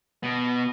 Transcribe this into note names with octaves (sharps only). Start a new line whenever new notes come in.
B2